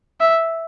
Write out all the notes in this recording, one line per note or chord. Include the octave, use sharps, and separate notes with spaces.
E5